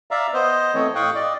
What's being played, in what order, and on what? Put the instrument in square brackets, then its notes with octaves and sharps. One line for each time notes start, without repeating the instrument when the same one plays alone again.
[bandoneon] D5 E5 F5 A#5
B3 C5 D#5
E3 A3 C4 C#5 D#5
A2 F5 G5 C#6 D#6 F#6
D5 D#5